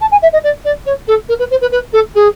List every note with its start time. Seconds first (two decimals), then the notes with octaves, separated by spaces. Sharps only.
0.01 A5
0.11 G#5
0.22 E5
0.32 D#5
0.43 D5
0.64 D5
0.85 C#5
1.07 A4
1.28 A#4
1.39 B4
1.50 C5
1.61 B4
1.71 B4
1.92 A4
2.14 G#4